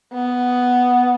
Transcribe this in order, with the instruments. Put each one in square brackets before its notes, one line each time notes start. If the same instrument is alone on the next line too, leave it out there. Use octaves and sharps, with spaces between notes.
[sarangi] B3